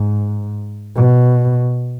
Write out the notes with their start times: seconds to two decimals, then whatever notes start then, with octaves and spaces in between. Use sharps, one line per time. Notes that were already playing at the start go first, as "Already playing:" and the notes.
Already playing: G#2
0.96 B2